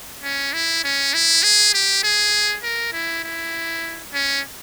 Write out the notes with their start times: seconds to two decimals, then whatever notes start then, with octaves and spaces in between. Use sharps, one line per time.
0.23 C#4
0.53 E4
0.84 C#4
1.14 E4
1.43 G#4
1.74 G4
2.03 G#4
2.63 A#4
2.93 E4
3.24 E4
4.13 C#4